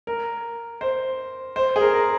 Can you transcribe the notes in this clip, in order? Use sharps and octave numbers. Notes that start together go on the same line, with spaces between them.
A#4
C5
C5
G#4
A#4
A#4